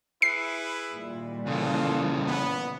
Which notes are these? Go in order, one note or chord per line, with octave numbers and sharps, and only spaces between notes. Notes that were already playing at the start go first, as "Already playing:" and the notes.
E4 G#4 B4 C7
A#2 D#3 G3
C#3 E3 F4 A4
B3